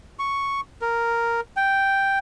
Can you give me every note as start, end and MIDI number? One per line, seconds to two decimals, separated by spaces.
0.19 0.60 85
0.82 1.41 70
1.57 2.19 79